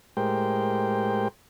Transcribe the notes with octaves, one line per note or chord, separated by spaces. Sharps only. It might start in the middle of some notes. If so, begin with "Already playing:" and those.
A2 G#3 G4 A#4 C5 G5